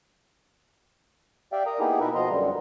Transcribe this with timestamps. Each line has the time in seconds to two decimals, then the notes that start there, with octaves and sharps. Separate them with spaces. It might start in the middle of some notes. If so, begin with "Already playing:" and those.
1.52 G4 D5 E5 F5 G5
1.66 A#4 A#5 D#6
1.80 A#3 B3 D#4 E4 G4 G#4
2.00 B2 D#4 A#4 B4 E5
2.15 B2 F3 B3 D#5 A#5 C6
2.30 F#2 D3 G3